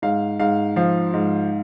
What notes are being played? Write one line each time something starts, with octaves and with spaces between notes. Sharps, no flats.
G#2 F5
G#2 F5
F3 F5
G#2